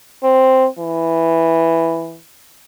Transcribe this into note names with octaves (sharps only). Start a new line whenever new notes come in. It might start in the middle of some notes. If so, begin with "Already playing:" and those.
C4
E3